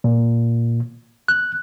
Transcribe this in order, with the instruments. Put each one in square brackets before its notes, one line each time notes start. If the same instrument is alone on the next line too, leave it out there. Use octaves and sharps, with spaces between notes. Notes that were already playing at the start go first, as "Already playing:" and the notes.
[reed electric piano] A#2
F#6